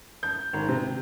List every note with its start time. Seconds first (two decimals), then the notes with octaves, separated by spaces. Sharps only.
0.23 G6
0.53 G#1
0.68 C3